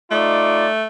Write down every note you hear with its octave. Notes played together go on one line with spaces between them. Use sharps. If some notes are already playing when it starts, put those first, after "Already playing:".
A3 D#4 F4 D5